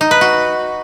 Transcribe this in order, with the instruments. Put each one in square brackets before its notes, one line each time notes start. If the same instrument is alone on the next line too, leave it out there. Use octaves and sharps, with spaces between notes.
[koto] D#4
B4
F#4